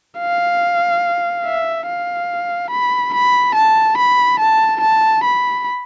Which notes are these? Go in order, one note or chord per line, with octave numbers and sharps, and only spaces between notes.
F5
E5
F5
B5
B5
A5
B5
A5
A5
B5